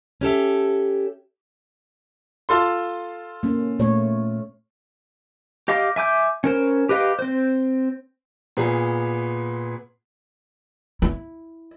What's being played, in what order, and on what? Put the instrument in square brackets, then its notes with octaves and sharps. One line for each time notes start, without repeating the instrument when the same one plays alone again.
[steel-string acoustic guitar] C#4 G4 A4 E5
[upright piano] F4 A4 C6
[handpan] A#3 C#4
A#2 A3 C#5
[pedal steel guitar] G4 D#5 F5 D6
E5 G#5 D6 G6
C#4 A#4 C5
G4 B4 D#5 F5 G5
C4 C5
[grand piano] A#2 B3 G#4
[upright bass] E4